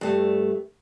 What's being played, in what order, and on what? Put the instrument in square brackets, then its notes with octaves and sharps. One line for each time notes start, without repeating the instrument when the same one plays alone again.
[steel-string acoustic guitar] G2 A3